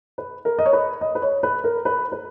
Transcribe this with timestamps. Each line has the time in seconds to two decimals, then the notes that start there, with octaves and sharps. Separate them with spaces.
0.18 B4
0.45 A#4
0.59 D#5
0.66 C#5
0.73 B4
1.01 D#5
1.15 B4
1.22 C#5
1.43 B4
1.64 A#4
1.85 B4
2.12 B4